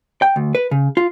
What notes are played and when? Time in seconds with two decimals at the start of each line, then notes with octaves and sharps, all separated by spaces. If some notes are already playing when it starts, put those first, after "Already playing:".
0.22 G5
0.36 D2
0.55 B4
0.71 C#3
0.97 F4